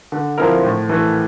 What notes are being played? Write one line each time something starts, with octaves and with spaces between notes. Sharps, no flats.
D3
F3 C4 E4 A#4
A2
E3 A3